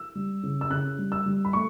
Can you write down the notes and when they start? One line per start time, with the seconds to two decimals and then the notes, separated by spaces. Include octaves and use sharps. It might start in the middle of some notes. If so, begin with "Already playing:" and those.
Already playing: E6
0.15 G3
0.43 C#3
0.61 E6
0.71 C#3 F#6
0.98 G3
1.12 E6
1.26 G3
1.45 B5
1.53 A3 C#6